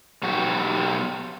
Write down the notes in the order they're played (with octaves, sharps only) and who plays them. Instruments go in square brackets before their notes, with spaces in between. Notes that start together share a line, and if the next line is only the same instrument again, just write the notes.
[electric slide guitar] B2 F#3 F#4 G4